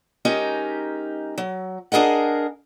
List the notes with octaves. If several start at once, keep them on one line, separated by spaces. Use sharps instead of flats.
G#3 C#4 D#4 G4 A#4
F#3
D4 G#4 A#4 D#5 F#5